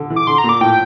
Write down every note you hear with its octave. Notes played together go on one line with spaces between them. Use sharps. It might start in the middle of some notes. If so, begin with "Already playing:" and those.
Already playing: D3
E3
D6
D3 C6
A#5
A#2
D6
A2 G5